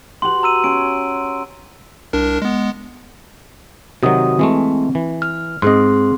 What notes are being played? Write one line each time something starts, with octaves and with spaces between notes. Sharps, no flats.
F#4 G4 B4 C6 F#7
A#5 E6 D#7
C#4 C6 D7
C2 D4 A#4
G#3 B3
C3 D#3 F#3 F#4 D#6
E3 G#3 A3 C4
E3
F6
G#2 C4 G#4 D#5 C6